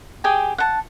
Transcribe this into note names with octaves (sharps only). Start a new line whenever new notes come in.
G4 G#4 G5 G#5
F#5 A5